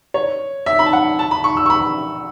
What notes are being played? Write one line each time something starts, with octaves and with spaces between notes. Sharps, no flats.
C#5
E5
B5
A5
F#5
A5
B5
C#6
E6
C#6
B5